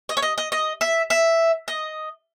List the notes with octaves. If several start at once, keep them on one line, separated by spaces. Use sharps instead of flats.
D#5
C#5
D#5
D#5
D#5
E5
E5
D#5